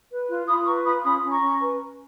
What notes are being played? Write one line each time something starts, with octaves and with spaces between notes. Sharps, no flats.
B4
F4
F4 B5 D#6
B4 A#5 C#6
F4 B5 D#6
C#4 B5 D#6
C#4
A#5 C#6
C#4
B4